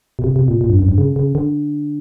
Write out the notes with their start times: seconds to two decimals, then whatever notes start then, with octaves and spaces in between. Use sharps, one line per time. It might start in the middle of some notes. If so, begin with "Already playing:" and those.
0.19 B2
0.24 C3
0.36 C3
0.48 A#2
0.61 A#2
0.70 G2
0.79 F#2
0.89 G2
0.98 C#3
1.16 C#3
1.35 D3